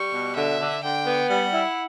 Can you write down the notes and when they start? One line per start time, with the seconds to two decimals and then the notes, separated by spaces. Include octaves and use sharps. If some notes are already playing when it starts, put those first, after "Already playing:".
Already playing: G3 C#6
0.13 B2
0.36 D3 E5
0.60 D3
0.83 D3 G5
1.06 B3
1.30 G3 F#5
1.53 E4